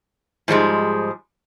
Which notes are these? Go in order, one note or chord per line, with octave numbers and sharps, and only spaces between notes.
G#2 F3 G3 G#3